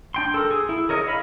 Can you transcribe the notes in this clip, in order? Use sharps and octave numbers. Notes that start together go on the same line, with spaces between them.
D4 G5 C6
A4 A#4
G#4
E4
G#4 A#4 C#5 D#5
D#5 F5 B5